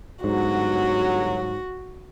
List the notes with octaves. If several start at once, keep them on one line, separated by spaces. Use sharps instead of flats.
G1 G#2 F#3 F#4